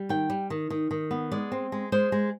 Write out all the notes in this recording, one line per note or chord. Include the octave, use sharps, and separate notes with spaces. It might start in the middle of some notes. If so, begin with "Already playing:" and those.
Already playing: G3
D#3 G5
G3
D#3
D#3
D#3
B3
G#3 D5
C4
G#3
G#3 C5
G#3